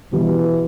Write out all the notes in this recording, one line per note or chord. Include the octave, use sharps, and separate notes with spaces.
B2 E3 G3 B3